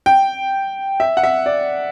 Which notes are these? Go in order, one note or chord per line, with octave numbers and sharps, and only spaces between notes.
G5
E5
F#5
E5
D5